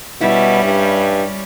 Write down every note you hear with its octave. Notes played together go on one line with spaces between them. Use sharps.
B2 G3 C#4 E4
G2